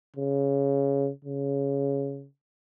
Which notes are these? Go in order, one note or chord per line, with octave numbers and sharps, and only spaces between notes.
C#3
C#3